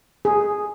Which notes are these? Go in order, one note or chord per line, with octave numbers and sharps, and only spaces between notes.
G#4